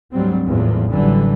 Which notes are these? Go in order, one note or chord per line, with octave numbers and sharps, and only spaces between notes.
D2 G#2 F#3 G3 C4
G#1 E2 A2 F3 F#3
A1 A2 D3 E3 F#3 G3